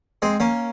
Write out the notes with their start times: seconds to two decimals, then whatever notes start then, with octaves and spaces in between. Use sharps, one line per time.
0.22 G#3 C4
0.40 A#3 C#4